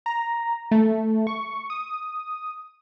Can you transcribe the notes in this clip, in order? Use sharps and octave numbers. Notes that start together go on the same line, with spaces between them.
A#5
A3
C#6
D#6